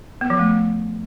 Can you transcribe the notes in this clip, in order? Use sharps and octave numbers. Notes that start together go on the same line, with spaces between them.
B3
F3
A3